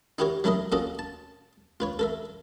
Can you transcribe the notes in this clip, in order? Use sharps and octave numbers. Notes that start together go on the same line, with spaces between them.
D#4 E4 F#4 G4 A#4 C#5
F#3 A3 E4 A4 A#4 D#5
A#3 C#4 F4 F#4 A4 D#5
A5
F4 B4 C#5
A4 A#4 E5